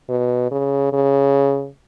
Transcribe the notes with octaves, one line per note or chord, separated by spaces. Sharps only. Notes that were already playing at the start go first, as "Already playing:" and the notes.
B2
C#3
C#3